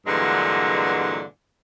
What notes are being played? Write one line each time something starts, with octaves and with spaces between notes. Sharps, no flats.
G2 A#2 D3 E3 F#3 G#3